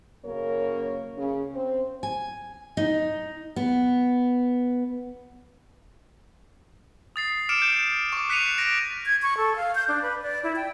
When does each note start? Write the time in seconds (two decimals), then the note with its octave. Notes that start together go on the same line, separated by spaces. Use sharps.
0.25 F#2 C#3 A#3 A#4 C#5
1.18 C#3 C#4
1.54 C4
2.03 G#5
2.77 D#4
3.56 B3
7.16 D#6 A6 C7
7.49 D6 F6 C#7 D7 E7
7.62 G6
8.12 C#6 D6
8.29 F#6 B6 C#7 D#7 F7
8.58 A#6 D7
9.06 G#6
9.22 C#6
9.37 A4
9.56 F5
9.75 G6
9.88 D4
10.02 B4
10.22 D5
10.43 E4
10.56 G5